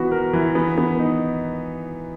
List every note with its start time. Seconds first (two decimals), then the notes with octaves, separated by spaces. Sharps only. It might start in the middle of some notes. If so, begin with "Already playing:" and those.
Already playing: E3 B3 F#4
0.11 A#4
0.33 E3
0.55 B3
0.78 B3
0.99 D#4